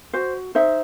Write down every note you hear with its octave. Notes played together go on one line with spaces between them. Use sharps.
F#4 C5
D#4 C5 E5